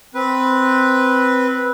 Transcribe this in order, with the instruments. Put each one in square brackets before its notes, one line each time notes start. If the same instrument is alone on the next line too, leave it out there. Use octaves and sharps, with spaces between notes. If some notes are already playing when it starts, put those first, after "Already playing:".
[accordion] C4 B4